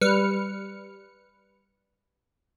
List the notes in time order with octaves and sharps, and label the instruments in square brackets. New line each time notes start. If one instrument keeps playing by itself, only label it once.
[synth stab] G3 B4 F6 C#7